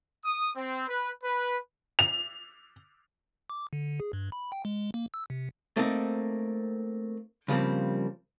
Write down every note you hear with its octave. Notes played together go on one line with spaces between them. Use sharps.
D#6
C4
B4
B4
F7
D6
D3
G#4
G2
B5
G5
G#3
A#3
E6
C3
A3 A#3 C4 D#4
C#3 F3 G3 A#3 C4